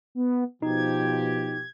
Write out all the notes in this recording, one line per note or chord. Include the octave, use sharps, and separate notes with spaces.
B3
B2 F3 D#4 G4 G#6